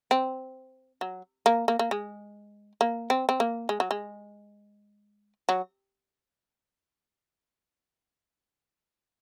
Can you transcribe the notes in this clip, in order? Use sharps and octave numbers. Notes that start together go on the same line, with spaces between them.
C4
F#3
A#3
A#3
A#3
G#3
A#3
C4
C4
A#3
G#3
F#3
G#3
F#3